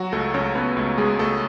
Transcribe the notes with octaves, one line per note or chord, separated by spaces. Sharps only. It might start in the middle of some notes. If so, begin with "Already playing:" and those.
Already playing: F#3 F#4
C#2 A3 A4
C#2 C#4 C#5
C#2 B3 B4
C#2 A3 A4
C#2 G#3 G#4
C#2 A3 A4